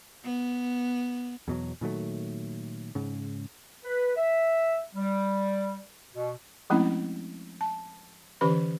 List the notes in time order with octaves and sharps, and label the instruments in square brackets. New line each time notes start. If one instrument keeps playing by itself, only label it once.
[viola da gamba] B3
[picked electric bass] E2 B2 F#3
A#2 D#3 F#3 A3
G#2 C#3
[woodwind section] B4
E5
G3
B2
[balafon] F3 G#3 A3 C4 C#4 E4
A5
D3 E3 C#4 G4 B4 B5